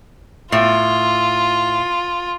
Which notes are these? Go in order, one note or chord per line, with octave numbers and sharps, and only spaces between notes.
A2 F4